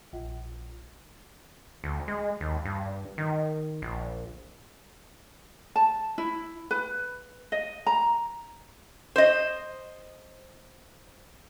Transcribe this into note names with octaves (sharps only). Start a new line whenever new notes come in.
A#1
D2
G#3
D#2
G2
D#3
A#1
A5
E4
B4
D#5
A#5
C5 D#5